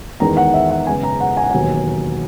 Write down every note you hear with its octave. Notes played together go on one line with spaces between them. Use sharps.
E2 D#3 G#3 B3 A#5
F#5
E5
F#5
F#2 C#3 G#3 B3 G#5
A#5
F#5
G#5
F#5
E1 D#2 D#3 F#3 B3 G#5